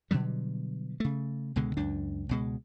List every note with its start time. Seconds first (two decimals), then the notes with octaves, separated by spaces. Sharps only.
0.11 B2 D3 F#3 G3
1.00 C#3 A3
1.56 C#2 B2 D3 G#3
1.77 C#2 F#2 D4
2.29 C#2 B2 G#3